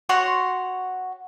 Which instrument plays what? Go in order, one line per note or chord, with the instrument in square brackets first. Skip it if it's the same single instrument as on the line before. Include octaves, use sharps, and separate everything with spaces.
[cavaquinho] F#4 C#5 F#5 C6